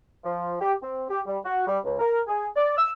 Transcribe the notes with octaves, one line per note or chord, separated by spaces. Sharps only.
F3
G4
C4
G4
G3
F#4
G3
C#2
A#4
G#4
D5
E6